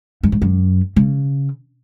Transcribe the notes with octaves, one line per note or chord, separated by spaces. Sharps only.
F#2
G#2
F#2
C#3